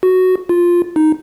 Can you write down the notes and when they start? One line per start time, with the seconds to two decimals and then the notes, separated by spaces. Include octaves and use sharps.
0.03 F#4
0.49 F4
0.96 D#4